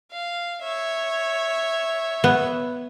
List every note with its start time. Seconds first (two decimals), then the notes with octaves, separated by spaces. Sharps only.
0.12 F5
0.61 C#5 E5
2.24 B3